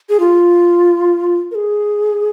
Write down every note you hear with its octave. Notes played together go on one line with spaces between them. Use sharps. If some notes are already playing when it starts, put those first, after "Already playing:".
G#4
F4
A#4
G#4